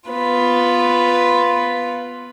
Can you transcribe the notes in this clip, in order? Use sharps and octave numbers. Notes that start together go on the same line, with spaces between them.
B3 F4 B4